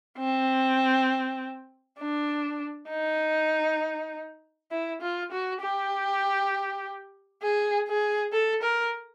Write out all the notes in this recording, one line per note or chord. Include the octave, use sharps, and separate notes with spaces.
C4
D4
D#4
E4
F4
F#4
G4
G#4
G#4
A4
A#4